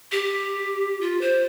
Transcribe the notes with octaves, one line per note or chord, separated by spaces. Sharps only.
G4
F4
C5